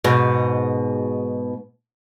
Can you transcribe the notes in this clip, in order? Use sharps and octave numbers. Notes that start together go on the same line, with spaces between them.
G#2 B2